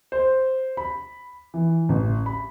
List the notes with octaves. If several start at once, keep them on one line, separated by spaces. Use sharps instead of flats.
C5
B5
E3
A1
B5